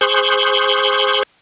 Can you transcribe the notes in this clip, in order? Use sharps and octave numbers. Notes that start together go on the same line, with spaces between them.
G#4 C5 C#6 F#6 G6